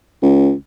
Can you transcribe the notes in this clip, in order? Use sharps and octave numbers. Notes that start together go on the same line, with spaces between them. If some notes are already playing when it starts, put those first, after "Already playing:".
C#2